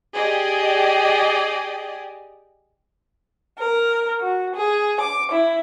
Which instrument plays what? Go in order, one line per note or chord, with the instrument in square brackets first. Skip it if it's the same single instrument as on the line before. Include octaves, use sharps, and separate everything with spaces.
[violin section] G4 G#4 D5 D#5
[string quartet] A#4
F#4
G#4
D6
E4